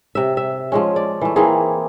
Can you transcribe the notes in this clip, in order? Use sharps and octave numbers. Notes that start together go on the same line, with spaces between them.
C3 E5
E5
F3 G#3 C#4
D5
E3 A3
E3 A#3 C4 G#4